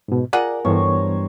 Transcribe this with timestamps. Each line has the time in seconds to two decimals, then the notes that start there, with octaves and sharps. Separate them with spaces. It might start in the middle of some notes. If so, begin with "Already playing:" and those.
0.08 G#2 B2
0.33 F4 G#4 A#4 D5 F#5
0.65 G2 E3 B3 C5 C#5